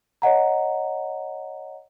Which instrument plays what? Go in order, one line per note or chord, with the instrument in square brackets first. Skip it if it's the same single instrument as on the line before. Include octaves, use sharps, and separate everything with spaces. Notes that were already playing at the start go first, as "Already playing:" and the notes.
[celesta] C#5 D#5 F#5 A#5